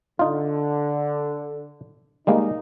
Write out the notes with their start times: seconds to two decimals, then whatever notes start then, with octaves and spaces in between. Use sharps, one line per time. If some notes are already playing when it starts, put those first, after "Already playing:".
0.19 D3 D#4 F4
2.27 G3 G#3 A#3 D#4